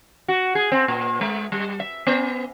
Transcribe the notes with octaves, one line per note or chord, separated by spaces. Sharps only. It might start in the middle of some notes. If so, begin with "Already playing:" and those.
F#4
G#4
C4
A#2
G#3
G3
E5
B3